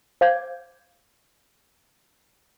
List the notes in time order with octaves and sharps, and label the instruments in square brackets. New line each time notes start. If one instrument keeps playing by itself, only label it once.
[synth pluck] C5 F5 D6 G6 G#6